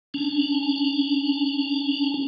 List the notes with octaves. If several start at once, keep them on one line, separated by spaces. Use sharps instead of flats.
C#4 D4